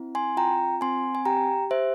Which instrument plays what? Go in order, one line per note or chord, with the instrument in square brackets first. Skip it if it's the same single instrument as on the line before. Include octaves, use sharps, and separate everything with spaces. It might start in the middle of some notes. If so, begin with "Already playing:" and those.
Already playing: [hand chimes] C4 E4
G#5 C6
F4 G5 A#5
C4 G#5 C6
G#5
G4 G5 A#5
G4 C5 E5